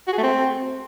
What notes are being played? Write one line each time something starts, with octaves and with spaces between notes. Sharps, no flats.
F#4
G#4
A3
C4